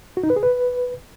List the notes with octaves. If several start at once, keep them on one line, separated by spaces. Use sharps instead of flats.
F#4
D#4
B4
G#4
B4